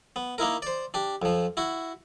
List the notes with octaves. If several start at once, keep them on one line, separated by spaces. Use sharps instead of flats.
B3
A#3 D#4 E4 A#4
C5 D5
D4 G4
F2 F3
E4 F#4